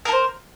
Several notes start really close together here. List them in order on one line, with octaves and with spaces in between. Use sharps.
A#4 A4 C5